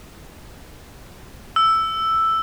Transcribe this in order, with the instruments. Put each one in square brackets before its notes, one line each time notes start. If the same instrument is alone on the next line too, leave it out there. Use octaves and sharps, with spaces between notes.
[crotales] E6